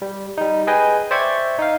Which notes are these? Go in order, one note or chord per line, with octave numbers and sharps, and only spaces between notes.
G3
G3 D#4
G#4 B4 D#5 G5 G#5
C5 D5 E5 G5 C#6 G#6
D#4 F5